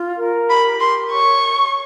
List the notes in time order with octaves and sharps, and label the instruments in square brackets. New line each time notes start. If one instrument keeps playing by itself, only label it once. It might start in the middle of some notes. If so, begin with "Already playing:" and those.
Already playing: [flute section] F4
A#4
[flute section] G4 [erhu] B5
[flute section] A#4 [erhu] C6
[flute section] C#5 [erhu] C#6
[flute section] C#5